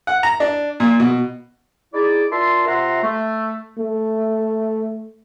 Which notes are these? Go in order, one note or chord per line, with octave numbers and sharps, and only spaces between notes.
F#5
A#5
D4
A#2
B2
D#4 E4 G#4 D5
D4 F4 A#4 E5 A5 C6
C3 F4 E5 F#5 A#5 C6
A3
A3